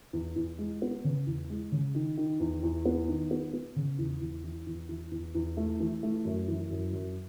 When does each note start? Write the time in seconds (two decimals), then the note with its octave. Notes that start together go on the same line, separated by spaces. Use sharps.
0.13 E2
0.36 E2
0.58 G#3
0.82 B3
1.04 C#3
1.27 E2
1.50 G#3
1.72 C#3
1.95 D#3
2.17 D#3
2.40 E2
2.63 E2
2.85 B3
3.08 D#3
3.31 B3
3.53 B3
3.76 C#3
3.99 E2
4.21 E2
4.44 E3
4.67 E2
4.89 E3
5.11 E2
5.35 E2
5.57 A3
5.80 E3
6.03 A3
6.25 F#2
6.48 E3
6.71 F#2
6.93 F#2